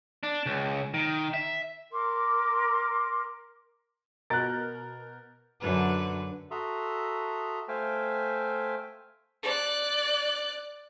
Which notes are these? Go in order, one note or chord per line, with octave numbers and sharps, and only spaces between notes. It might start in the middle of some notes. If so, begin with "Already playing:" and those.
D4
C#2
D#3
E5
A#4 C6 D6
B2 A#4 F#6 G6 A6
F#2 D3 B4
F#4 A4 E5 A#5 C6 D#6
A3 C5 E5 F5 G5 G#5
D5 F#6